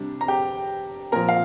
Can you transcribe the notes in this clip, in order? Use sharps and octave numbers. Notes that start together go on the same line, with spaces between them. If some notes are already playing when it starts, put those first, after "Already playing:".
Already playing: C3 G3 D4
A#5
G4 G5
A#2 F3 A#4 A#5
F5